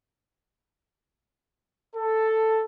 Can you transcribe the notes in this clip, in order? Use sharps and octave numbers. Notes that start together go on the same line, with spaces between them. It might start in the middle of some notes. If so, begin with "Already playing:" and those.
A4